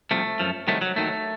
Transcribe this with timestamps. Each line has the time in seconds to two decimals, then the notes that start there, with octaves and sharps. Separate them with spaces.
0.11 C2 C3 F3 A3
0.39 F#2 F3
0.67 C2 C3 D#3 F#3 A3
0.81 F#3
0.96 D#2 D#3 F#3 A3